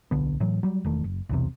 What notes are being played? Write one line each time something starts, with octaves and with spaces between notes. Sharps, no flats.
D1 B1 D3 B3
A2 E3 F#3
F#3 G3
E1 D#3 A3
F#1
B1 E2 C3